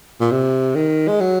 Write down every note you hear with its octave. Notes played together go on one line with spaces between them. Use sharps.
A#2
C3
D#3
G#3
F#3